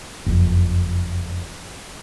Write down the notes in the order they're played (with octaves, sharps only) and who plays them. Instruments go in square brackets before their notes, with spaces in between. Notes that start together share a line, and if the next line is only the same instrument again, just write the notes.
[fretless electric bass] F#1 F2